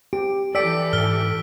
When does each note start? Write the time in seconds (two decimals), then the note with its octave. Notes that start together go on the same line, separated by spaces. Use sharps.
0.13 G4 D7
0.55 E3 G4 A4 D5 G5 E6 B6 D7
0.93 G#2 F6 G7